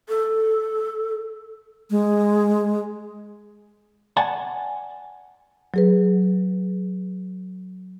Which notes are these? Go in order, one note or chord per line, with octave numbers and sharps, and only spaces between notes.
A4
G#3
D5 F#5 G#5 A5
F#3 G#4 B4